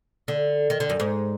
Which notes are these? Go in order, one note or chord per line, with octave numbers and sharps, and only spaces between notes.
D3
D#3
D3
F#2
G#2